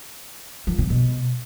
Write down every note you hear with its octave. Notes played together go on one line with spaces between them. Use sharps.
F3
C3
B2